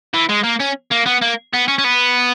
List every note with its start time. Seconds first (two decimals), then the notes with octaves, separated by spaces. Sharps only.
0.14 E3
0.29 G#3
0.43 A#3
0.60 C#4
0.91 A#3
1.06 B3
1.21 A#3
1.53 B3
1.68 C#4
1.78 C#4
1.84 B3